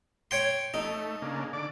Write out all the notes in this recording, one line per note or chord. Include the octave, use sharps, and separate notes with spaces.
C#5 G5 C6
A3 D#4
C#3 A#3 D4
D3 D5 D6